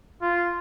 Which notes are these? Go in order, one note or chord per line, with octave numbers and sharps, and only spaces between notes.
F4